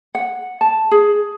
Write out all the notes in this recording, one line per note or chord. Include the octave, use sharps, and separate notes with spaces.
F#5
A5
G#4